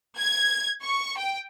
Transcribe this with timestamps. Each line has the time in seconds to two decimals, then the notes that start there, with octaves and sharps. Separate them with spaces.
0.18 G#6
0.83 C#6
1.18 G5